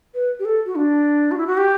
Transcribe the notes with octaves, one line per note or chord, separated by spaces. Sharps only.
B4
G4
A4
F#4
D4
F#4
E4
F#4
G4